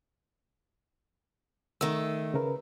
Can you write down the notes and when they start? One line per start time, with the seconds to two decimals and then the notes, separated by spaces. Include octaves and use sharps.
1.81 D#3 A3 E6
2.34 C#3 A#4 B4